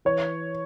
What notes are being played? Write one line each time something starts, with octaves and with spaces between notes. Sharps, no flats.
E3 C#5